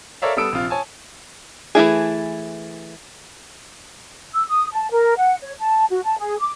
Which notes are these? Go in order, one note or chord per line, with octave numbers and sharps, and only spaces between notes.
A4 A#4 C#5 D5 E5 F5
G3 B3 A4 D#6 E6 D7
A#1 C3 F4
C#5 G#5 A5
E3 A3 E4 G#4
E6
D#6
A5
A#4
F#5
C#5
A5
F#4
A5
G#4
D6